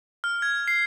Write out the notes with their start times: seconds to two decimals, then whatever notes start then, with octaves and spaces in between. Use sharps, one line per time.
0.24 F6
0.42 G#6
0.68 C7